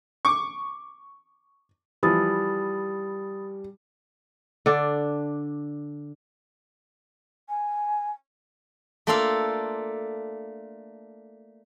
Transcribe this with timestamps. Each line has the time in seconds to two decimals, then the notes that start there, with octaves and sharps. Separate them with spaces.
0.25 C#6 D6
2.03 E3 F3 G3 B5 D#6 A6
4.66 D3 D4
7.49 G#5
9.07 A3 A#3 D4 F4 A4 F5